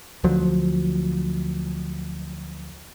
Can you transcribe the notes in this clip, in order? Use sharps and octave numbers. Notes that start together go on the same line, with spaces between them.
D2 F3 F#3